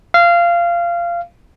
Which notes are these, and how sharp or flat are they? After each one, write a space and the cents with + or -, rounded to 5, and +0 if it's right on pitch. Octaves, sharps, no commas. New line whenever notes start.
F5 -20